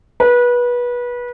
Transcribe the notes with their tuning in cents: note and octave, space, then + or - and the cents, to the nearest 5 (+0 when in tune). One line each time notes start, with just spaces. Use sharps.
B4 -25